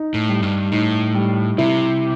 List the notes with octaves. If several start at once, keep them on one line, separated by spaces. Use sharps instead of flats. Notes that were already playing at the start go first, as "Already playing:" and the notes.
Already playing: D#4
A2
G3
G2
A2 D#4
G3
C3 E4